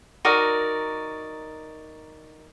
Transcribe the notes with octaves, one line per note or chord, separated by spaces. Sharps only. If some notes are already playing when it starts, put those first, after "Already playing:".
D#4 F#4 A#4 D5